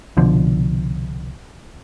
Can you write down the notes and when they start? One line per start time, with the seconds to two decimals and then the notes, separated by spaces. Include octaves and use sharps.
0.17 C2 B2 D3 F3